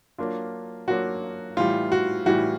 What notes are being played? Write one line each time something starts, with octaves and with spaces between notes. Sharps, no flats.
F#3 A#3 D4 F4
F#3 A#3 D4 F4 F#4
A2 E3 G3 F4
F#4
A2 E3 G3 F#4